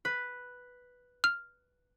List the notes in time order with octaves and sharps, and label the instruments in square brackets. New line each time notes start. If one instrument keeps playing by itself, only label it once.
[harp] B4
[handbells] F6